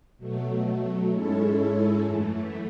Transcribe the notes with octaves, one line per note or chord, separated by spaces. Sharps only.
B2 F#3 A3
G#2 G#3 C#4 E4 A4
F#2 E3 A3